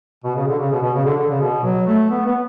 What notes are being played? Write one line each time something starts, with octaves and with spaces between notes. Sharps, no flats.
B2
C#3
D3
C#3
B2
B2
C#3
D3
D3
C#3
B2
F#3
A3
B3
B3